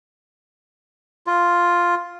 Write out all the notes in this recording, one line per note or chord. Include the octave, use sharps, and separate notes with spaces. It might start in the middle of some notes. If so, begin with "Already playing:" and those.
F4